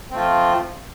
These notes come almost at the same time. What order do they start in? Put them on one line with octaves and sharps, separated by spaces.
C4 A3 F4 F3